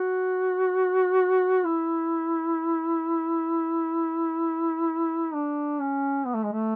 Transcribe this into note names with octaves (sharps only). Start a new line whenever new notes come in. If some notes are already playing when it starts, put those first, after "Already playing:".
Already playing: F#4
E4
D4
C#4
B3
A3
G#3
A3